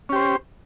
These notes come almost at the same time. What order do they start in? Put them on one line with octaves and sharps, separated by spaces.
C#4 G4 C5